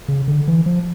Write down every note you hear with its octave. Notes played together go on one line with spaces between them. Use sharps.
C#3
D3
E3
F3